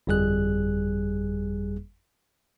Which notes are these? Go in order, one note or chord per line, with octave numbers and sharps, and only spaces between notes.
G1 F2 G3 G#4 F#6